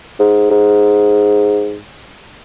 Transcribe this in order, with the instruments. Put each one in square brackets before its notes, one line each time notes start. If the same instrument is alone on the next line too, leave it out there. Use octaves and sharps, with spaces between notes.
[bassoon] G#2
G#2